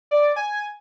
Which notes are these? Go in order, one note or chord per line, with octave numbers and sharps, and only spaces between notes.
D5
G#5